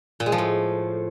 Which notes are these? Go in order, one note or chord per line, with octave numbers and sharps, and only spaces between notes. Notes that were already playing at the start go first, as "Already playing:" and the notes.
A#2
G#3
F3
A2